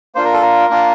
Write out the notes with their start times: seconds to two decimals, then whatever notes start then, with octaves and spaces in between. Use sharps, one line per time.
0.15 A#3 D4 F4 C5
0.24 A#4
0.33 A4
0.42 A#4
0.69 A#3 D4 F4